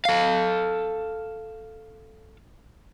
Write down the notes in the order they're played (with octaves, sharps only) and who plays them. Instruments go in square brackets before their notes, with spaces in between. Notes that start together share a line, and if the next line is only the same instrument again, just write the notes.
[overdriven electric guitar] A4 F5